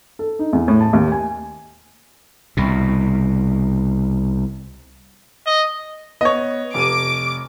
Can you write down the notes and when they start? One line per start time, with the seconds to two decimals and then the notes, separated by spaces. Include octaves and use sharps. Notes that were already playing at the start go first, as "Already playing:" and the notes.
0.19 A4
0.39 D#4
0.53 E2
0.68 A2
0.81 A5
0.93 D#2
1.12 G#5
2.57 C2 B2
5.46 D#5
6.21 B3 C#5 D#5
6.74 F1 D6 D7 D#7